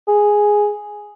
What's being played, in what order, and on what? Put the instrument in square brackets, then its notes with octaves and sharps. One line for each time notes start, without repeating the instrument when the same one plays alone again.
[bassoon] G#4